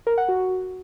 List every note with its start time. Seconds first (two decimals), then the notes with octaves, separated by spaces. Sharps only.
0.07 A#4
0.18 F#5
0.29 F#4